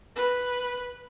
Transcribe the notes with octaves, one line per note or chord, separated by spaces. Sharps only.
B4